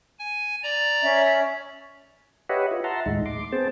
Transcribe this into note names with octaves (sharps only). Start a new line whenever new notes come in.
G#5
D5 A#5
C#4 E5
G4 B4 C#5 D#5 E5 F#5
F4
E5 F#5 A5 A#5 C6
D#2 A2 G#3 D#4
C6 D6
B3 C4 G#4 C5 A5